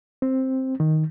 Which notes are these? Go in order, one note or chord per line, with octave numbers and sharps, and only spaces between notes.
C4
D#3